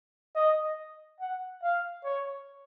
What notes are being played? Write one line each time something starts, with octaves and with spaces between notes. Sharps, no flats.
D#5
F#5
F5
C#5